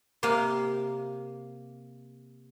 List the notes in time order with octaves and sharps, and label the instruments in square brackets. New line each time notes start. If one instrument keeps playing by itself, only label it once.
[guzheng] C3 A#3 A#4 F5